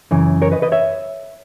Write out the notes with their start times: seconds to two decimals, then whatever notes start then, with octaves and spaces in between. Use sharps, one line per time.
0.11 F#2 C#3 E3
0.42 A#4 C#5
0.52 B4 D#5
0.62 B4 D#5
0.72 C#5 E5